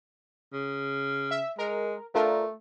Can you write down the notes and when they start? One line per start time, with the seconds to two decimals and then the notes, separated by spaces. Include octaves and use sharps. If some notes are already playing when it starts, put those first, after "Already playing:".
0.53 C#3
1.31 E5
1.59 G#3 A#4
2.15 A3 D4 F4 A#4